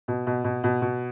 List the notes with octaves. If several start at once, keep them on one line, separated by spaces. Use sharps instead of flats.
B2
B2
B2
B2
B2